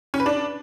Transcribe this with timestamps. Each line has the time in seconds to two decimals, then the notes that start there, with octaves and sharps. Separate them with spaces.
0.14 C#4
0.20 B4
0.26 D4